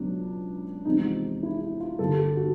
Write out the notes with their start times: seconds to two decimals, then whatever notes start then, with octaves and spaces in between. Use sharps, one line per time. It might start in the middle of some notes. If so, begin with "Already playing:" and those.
Already playing: C#2 B2 F#3 B3 D4
0.85 E2 C3 F3 G#3 C4 D#4
1.43 E4
1.61 E4
1.80 F4
1.99 G2 D3 G3 A#3 A4
2.19 G4
2.37 F#4